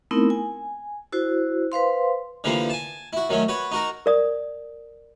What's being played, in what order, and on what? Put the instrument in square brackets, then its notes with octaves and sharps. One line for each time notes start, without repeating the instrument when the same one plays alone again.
[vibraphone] A3 B3 C4 D#4 E4 A#4
G#5
E4 F#4 C5
B4 C5 F5 C6
[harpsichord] D3 E3 F3 G3 A#3
G#5 A5
E4 F#4
D#3 F#3 A3 C#4
F#4 B4 C#5
D#4 F#4 A#4
[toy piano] A#4 D5 D#6